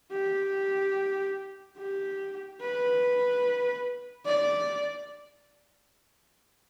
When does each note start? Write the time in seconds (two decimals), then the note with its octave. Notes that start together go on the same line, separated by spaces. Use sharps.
0.12 G4
1.78 G4
2.61 B4
4.26 D5